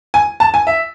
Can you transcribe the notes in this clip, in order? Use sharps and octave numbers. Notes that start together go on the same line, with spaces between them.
G#5
A5
G#5
E5